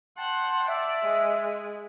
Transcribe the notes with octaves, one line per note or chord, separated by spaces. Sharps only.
F#5 G5 A5 C6
D5 E5
G#3